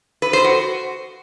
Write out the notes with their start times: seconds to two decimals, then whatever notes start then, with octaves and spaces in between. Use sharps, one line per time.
0.22 B4
0.33 C5
0.44 F#4